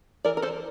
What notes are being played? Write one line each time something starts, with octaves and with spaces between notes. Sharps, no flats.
E3 A#4 D5
A#4
A4 C5